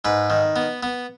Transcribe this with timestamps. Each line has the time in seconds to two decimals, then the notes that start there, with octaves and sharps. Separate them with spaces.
0.05 G#2 B4
0.30 D#3
0.56 B3
0.83 B3